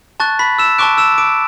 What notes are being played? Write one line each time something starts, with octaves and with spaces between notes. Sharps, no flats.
A5 C#6 F#6 A6
B5 B6
E6 E7
A5 C#6 D6 F#6 D7
E6 E7
D6 D7